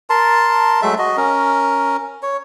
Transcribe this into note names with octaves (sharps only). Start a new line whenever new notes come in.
A#4 A5 C6
F#3 G#3 A3 E5
F#4 D#5
C#4 A#4
C#5